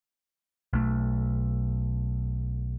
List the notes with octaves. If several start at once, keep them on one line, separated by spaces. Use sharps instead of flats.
B1 A3